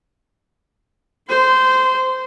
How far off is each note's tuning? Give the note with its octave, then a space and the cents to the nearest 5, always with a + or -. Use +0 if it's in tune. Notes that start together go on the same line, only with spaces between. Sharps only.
C5 -15 C6 -30